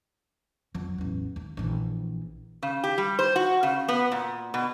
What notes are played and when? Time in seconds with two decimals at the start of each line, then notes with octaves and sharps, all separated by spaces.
0.75 F2 F#3
0.98 A1 E2
1.36 D#2
1.57 A#1 E3
2.63 C#3
2.84 G4
2.98 G3
3.19 C5
3.36 F#4
3.63 C#3
3.88 B3
4.11 A#2
4.54 B2